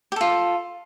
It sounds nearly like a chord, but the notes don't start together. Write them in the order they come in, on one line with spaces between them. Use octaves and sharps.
G4 A4 F4